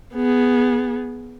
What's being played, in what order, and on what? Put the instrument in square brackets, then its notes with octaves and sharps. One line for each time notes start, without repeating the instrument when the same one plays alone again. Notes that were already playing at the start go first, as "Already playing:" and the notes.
[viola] B3 G#4